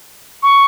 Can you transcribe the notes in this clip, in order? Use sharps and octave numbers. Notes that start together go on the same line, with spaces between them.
C#6